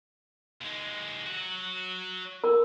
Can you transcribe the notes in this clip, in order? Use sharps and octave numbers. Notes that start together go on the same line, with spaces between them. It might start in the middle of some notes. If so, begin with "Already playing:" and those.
D#2 G#3
F#3 F#4
A#4